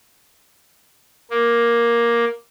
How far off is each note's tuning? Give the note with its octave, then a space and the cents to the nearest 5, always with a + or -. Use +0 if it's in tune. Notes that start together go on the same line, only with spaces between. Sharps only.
A#3 +10